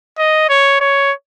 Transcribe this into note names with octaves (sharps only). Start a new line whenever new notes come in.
D#5
C#5
C#5